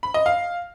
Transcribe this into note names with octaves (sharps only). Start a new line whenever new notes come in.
B5
D#5
F5